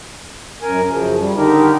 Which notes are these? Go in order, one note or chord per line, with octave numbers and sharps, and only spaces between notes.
F#2 A#4 G#5
F#2 C#3 F3
G3
D3 D#3 D#4 G4 A#4